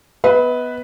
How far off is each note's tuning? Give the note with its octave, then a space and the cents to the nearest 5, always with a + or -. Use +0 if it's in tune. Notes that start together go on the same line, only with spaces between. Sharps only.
B3 +0 B4 +0 D#5 +45